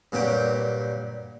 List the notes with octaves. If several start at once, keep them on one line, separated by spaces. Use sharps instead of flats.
G2 A#2 F#3 G4 G5